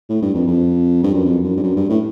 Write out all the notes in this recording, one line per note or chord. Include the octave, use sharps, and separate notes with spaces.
A2
G2
F2
F2
G2
F#2
F2
F#2
G2
F#2
G2
A2